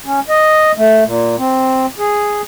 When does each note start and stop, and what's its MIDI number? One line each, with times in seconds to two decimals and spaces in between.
0.06 0.20 61
0.29 0.72 75
0.77 1.04 57
1.05 1.36 46
1.38 1.86 60
1.98 2.42 68